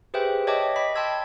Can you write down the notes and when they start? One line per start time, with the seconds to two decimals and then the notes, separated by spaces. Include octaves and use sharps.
0.14 G4 G#4 B4 C5 E5 G5
0.47 C#5 D#5 E5 G5 A5 D6
0.76 D#5 B5 B6
0.95 G5 A5 C6 E6 G#6